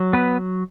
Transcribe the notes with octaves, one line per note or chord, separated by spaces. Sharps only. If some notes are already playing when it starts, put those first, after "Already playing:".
Already playing: F#3
B3 B4